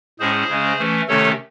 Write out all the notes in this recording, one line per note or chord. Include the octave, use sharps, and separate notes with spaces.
A2 G#3 C#4 G#4 C5
C#3 G#3 C#4
E3 A3 C#4
C3 D#3 A3 C#4 A4 C#5